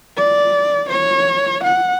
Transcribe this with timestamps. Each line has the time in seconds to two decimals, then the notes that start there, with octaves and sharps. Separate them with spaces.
0.17 D5
0.89 C#5
1.64 F#5